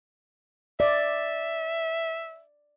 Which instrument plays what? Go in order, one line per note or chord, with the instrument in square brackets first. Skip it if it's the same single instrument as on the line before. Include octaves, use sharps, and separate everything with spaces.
[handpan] D5 [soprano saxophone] E5